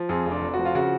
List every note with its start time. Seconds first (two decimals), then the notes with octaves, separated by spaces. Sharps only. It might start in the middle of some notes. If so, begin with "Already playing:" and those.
Already playing: F3
0.09 F2 G#4
0.26 F1
0.31 D4
0.42 F1
0.54 F3 F#4
0.65 F4
0.75 C#3 F#4